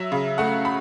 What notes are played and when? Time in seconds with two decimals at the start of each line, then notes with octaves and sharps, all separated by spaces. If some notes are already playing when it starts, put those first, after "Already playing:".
Already playing: F#3 E5
0.12 C#3
0.38 A3 F#5
0.65 B5